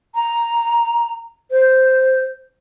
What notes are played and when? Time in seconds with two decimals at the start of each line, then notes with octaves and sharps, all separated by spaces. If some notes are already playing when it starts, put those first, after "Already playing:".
0.15 A#5
1.51 C5